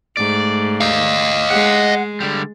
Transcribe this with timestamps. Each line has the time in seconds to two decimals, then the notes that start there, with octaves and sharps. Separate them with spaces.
0.17 G#2 A3 D5
0.81 D#5 F5
1.50 G#3 F#5
2.20 D3 G3